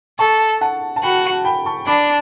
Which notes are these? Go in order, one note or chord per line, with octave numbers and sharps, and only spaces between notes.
A4 A5 C#6
F#5 A5
A5
F#4 G5 B5
G5 B5
A5 C#6
D4 B5 D6